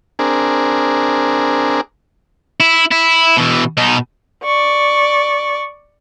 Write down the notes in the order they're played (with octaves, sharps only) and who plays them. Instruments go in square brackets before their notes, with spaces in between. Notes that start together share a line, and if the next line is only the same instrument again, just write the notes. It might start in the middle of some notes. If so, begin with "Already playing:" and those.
[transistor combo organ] C4 D4 G#4 A#4
[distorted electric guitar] E4
E4
B2 E3
B2 D#4
[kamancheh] D5 C#6